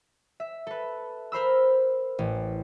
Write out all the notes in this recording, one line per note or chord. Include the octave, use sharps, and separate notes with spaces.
E5
A4 B4
A#4 C5 B5 E6
A1